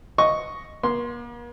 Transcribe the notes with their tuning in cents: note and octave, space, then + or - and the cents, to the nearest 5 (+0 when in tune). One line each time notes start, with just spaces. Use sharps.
D#5 +0 C#6 +0
A#3 +45 C6 +0